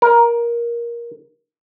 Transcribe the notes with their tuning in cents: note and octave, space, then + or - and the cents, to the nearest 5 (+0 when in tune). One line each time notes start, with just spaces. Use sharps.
A#4 +15